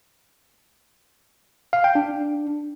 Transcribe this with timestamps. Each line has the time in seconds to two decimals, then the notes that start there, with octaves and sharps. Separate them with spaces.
1.73 F5
1.84 G5
1.95 D4